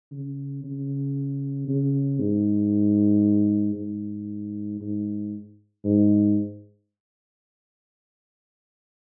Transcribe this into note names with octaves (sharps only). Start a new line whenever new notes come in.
C#3
C#3
C#3
G#2
G#2
G#2
G#2